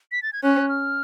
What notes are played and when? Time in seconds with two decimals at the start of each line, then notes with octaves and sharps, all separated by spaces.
0.12 B6
0.23 A6
0.33 G#6
0.43 C#4 F#6
0.69 F6